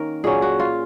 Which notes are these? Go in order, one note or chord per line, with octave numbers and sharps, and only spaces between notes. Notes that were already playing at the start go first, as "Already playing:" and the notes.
Already playing: D#3 A#3 C#4 A#4
A#2 F#3 C#4 G#4
F#4
F4